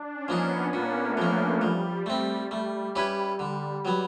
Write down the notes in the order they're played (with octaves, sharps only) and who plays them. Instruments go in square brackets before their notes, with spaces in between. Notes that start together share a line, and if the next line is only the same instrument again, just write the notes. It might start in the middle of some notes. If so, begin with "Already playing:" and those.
Already playing: [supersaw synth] D4
C#4
[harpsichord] F3 A#3 D#4
[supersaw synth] B3
[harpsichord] A#2 [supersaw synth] A#3
[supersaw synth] A3
[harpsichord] F3 A#3
[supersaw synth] A3
[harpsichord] F3 [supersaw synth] G3
[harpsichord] A3 C4
A3
C#4 E4 G4 B4
D3
F#3 B3